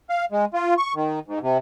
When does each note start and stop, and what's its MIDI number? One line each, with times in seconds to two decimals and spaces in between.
0.10 0.25 77
0.32 0.45 56
0.54 0.74 65
0.78 0.94 85
0.95 1.19 51
1.28 1.39 44
1.42 1.58 48